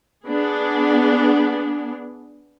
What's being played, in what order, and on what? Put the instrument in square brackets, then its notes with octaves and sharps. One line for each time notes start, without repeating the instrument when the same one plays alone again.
[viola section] B3 D4 G#4